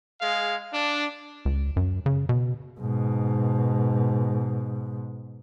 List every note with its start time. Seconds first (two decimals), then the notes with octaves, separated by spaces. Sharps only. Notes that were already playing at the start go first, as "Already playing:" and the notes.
0.21 G#3 G#4 F5
0.73 D4
1.45 C#2
1.76 F#2
2.06 C#3
2.29 B2
2.80 G#2 B2